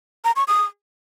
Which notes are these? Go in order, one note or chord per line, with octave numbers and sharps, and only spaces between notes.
A#5
C#6
D#6